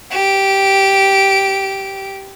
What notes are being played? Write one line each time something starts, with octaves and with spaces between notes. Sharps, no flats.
G4 D7